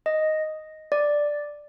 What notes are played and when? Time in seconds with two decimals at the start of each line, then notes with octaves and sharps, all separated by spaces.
0.06 D#5
0.92 D5